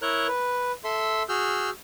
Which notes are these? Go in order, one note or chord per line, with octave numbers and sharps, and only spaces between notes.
E4 A#4 C#5 A#5 F#6
B4
A4 E5 C6
F#4 G#4 E6 F6 G6